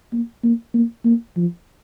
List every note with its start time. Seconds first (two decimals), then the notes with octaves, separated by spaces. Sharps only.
0.13 A#3
0.44 A#3
0.74 A#3
1.05 A#3
1.37 F3